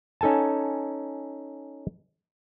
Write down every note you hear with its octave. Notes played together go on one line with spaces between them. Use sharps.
C#4 D#4 A4 G#5 A5